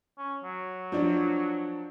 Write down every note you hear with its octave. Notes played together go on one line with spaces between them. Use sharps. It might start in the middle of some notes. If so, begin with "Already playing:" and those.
C#4
F#3
F3 D4